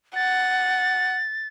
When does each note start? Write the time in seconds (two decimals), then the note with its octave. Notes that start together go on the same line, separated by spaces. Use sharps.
0.16 F#5 A6